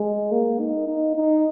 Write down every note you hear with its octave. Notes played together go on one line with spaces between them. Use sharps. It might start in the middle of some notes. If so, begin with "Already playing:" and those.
Already playing: G#3
A#3
D#4
D#4
D#4